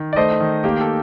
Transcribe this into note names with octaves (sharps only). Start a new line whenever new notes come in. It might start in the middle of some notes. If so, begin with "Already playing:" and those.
Already playing: D#3
D5
A3 C5 D#5
D#3
A#3 G4
A4